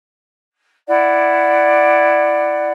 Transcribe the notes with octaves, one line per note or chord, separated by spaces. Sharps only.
E4 D5 F#5